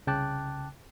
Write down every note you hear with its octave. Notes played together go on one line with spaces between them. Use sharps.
C2 C#3 G5 A5 D6 F#6